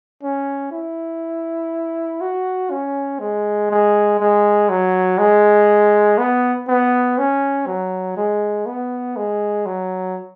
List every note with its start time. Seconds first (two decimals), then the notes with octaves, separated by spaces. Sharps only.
0.23 C#4
0.72 E4
2.21 F#4
2.71 C#4
3.20 G#3
3.71 G#3
4.20 G#3
4.69 F#3
5.18 G#3
6.18 B3
6.68 B3
7.18 C#4
7.67 F#3
8.17 G#3
8.66 B3
9.17 G#3
9.66 F#3